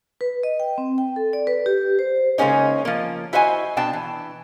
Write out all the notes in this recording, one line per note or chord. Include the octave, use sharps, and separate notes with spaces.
B4
D#5
G5
C4
G5
A4
D5
B4
G4
C5
C#3 G#3 A#3 C#4 D#4
F3 A#3
E4 F#4 C5 D#5 F5 G#5
B2 D4 G5 A5
E3